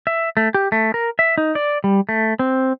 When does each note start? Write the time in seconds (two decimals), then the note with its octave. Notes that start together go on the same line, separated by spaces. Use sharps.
0.07 E5
0.37 A3
0.54 G4
0.72 A3
0.94 A#4
1.19 E5
1.38 D#4
1.55 D5
1.84 G3
2.09 A3
2.39 C4